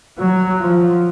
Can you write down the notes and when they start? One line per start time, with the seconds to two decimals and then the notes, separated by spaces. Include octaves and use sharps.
0.19 F#3
0.61 F3